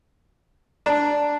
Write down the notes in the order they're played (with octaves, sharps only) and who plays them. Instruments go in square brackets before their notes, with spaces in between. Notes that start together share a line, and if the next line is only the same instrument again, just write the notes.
[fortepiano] D4 [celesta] A5 A#5